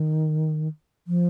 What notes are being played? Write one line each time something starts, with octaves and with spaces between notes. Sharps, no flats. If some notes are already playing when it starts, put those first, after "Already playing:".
Already playing: D#3
F3